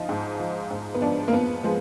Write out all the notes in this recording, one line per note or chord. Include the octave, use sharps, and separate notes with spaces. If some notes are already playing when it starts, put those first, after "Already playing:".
Already playing: F3 D#4
G#2
F3
G#2
B3
F3 D4
A#3
F2 B3
F3 G#3